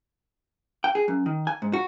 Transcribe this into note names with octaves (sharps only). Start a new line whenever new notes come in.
G5
G#4
F#2
D#3
G#5
G#2
F#4